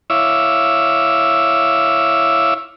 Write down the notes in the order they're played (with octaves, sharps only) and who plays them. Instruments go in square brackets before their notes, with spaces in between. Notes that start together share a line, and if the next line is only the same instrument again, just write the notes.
[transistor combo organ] E4 C#5 E5 F5 D6 E6